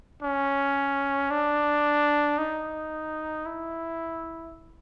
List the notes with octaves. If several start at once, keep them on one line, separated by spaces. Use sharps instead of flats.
C#4
D4
D#4
E4